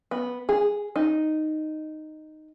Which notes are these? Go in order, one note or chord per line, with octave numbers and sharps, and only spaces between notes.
B3
G#4
D#4